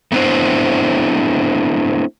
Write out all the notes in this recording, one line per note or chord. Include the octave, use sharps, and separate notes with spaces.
A3 B3 C4 D4 E4 C5